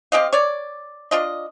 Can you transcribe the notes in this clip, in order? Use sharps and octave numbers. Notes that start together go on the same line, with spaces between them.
C4 G4 D#5 F5
C#5 D5
D4 F4 D#5